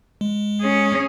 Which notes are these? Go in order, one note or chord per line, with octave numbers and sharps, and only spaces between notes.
G#3
C#4 G#4